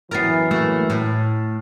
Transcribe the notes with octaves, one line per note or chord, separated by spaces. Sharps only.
F#2 E3 B3 A#4 F6 A6 C7
A3 A#3 F#4 E6 A6
A2